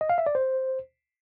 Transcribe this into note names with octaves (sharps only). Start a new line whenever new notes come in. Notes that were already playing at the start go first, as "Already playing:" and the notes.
D#5
F5
E5
D5
C5